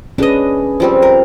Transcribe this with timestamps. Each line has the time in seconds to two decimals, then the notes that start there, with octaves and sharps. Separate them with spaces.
0.18 C#4 D4 G#4 B4 D#5
0.80 F3 G3 C4
1.02 A#4